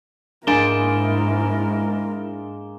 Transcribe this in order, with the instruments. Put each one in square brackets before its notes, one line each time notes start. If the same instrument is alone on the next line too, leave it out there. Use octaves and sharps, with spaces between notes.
[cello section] G#2 [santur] G#3 A#3 [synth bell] D4 E7 G7 [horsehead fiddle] E4 A#4